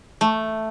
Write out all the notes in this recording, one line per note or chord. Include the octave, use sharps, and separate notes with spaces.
A3